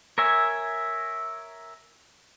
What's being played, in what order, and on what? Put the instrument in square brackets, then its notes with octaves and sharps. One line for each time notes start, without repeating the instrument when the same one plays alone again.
[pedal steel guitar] A#4 C#5 E5 G#5